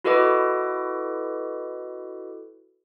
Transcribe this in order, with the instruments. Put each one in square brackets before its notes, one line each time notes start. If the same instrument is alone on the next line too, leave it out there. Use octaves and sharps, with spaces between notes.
[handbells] E4 F#4 A4 B4 D#5 D6